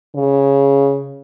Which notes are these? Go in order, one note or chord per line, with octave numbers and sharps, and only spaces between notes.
C#3